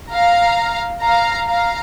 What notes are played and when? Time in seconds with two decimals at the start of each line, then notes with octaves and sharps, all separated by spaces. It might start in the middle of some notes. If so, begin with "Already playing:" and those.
0.11 F5 A#5
1.02 F5 A#5
1.48 F5 A#5